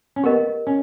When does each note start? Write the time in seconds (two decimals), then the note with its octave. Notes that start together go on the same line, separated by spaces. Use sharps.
0.16 C#4
0.23 B3 G4 A#4 D#5
0.67 C#4